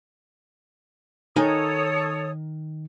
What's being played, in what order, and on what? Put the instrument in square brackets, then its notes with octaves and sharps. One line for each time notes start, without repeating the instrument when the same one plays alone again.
[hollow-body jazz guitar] D#3 D#4 G#5 [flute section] A4 C#5 D#6